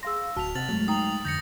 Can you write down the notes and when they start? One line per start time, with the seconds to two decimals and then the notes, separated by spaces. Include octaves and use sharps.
0.03 G#4 F5 C6 E6 A#6
0.37 D1 F#4 A5 F6 B6 F7
0.55 C3 D#5 F#5 F6 A6 F#7
0.69 G2 F#3 G#3 A3
0.88 D#4 G5 A#5 D#6 F#7
1.25 F2 D3 D#6 G6 A#6 C#7